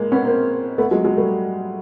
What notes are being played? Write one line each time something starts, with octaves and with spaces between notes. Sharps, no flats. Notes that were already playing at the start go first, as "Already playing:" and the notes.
Already playing: G#3 A#3
B3 C#4
A#3 C4
A3 B3
F#3 G#3
F#3 G#3
G3 A3